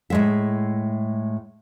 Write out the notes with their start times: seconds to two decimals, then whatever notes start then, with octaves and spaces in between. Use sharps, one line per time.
0.10 A2 G#3 E5